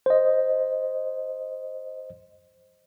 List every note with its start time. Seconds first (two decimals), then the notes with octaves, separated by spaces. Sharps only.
0.06 C5 D#5